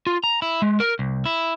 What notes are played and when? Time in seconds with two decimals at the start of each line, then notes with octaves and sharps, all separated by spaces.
0.07 F4
0.24 A#5
0.42 E4
0.62 G#3
0.80 A#4
0.99 C2
1.26 E4